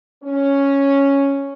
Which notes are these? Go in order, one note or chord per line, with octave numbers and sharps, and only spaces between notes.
C#4